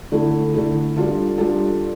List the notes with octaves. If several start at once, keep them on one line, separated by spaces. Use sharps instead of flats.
D3 A3 E4 A4
D3 A3 E4 A4
G3 D4 F4 A4
G3 D4 F4 A4